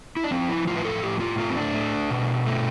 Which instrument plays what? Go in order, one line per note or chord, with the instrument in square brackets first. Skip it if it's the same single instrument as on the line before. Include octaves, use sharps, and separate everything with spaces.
[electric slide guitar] E4
D4
F3 C4
E4
A2 F4
B4
A4
A2 G4
F4
A3 F4
C4
D4
A3
B2
A3